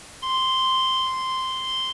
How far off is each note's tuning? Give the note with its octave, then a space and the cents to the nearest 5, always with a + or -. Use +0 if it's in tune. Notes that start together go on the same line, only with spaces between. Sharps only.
C6 -5